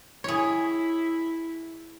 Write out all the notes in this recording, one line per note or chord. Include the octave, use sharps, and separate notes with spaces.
E4 G#4 C#5